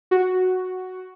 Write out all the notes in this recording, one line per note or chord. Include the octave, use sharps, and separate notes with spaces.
F#4